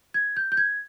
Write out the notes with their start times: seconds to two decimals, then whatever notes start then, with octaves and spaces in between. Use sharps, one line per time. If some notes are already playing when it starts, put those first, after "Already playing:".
0.14 G#6
0.37 G6
0.52 G6
0.57 G#6